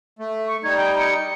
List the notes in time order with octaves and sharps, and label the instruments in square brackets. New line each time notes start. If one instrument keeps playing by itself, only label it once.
[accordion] A3
[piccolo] C#6
[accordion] G3 D#4 [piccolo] G#6
[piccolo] G5
C#7